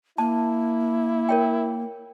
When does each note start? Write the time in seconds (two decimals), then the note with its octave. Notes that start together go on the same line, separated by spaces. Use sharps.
0.18 A#3 E4 A5
1.29 A#4 C#5 G5